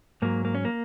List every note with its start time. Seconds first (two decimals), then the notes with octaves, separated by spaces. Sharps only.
0.22 G#2 F#3 A#3
0.45 A#3
0.55 C#4
0.65 A#3